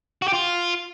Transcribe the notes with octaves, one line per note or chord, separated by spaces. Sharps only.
F#4
G4
F4